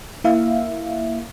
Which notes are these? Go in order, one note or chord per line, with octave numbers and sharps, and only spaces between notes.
A#3 E4 E5 F5